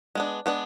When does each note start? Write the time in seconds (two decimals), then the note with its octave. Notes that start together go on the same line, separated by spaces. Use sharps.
0.15 G#3 B3 D4
0.46 G#3 B3 D4